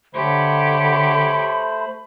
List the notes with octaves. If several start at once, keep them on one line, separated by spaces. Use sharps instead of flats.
D3 A3 G4 C5 C#5 B5